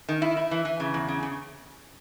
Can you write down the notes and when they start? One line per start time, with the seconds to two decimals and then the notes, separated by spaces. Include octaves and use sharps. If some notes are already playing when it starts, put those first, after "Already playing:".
0.09 D#3
0.22 E4
0.37 E4
0.51 E3
0.65 E3
0.80 C#3
0.94 E2
1.08 C#3
1.23 C#3